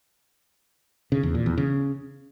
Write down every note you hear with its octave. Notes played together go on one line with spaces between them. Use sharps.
C#3
E2
A#2
E2
C#3